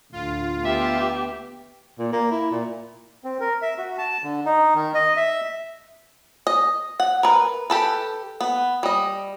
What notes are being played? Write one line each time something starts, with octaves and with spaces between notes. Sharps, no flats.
D2 A2 F4
B3 G4 E5
A#2
A#3
E4
A#2
C4
A#4
E5
F#4
A5
D3
D#4
D#3
D#5
E5
D#5
F#5
A#4 B4
G4 A4 B4
B3
G3 D#5